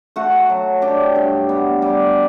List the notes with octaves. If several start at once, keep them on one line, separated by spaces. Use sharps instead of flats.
A3 F#4 F#5
F#3
D4 G4 G5
G2
B3
G3